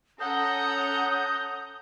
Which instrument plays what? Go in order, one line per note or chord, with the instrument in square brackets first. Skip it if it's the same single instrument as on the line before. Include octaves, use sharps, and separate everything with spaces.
[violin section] C#4 A4 F#5 [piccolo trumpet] A#5 [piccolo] D#6 [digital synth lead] G6